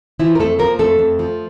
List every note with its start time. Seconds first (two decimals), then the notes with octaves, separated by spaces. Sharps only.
0.19 E3 F3 E4
0.35 A#4
0.39 F2 A3 A4
0.59 F3 A#3 A#4
0.79 F2 A3 A4
0.99 F2
1.19 F3